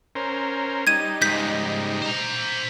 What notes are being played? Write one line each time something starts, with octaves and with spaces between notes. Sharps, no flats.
C#4 A#4 C5
G3 D#4 G#6 D#7
C#2 G#2 G6 B6
C5 A#5